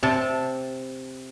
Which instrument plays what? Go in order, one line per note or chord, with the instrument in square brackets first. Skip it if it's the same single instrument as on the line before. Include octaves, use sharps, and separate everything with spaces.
[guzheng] C3 A5